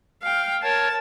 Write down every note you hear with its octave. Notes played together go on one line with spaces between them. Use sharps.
F5 G5
A#4 C#5 A5